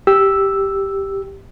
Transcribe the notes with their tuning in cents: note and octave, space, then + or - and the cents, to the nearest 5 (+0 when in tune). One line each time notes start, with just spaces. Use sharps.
G4 +0 E6 +0